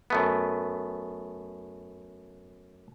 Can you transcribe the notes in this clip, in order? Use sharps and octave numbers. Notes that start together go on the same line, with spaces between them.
F#2 A3 B3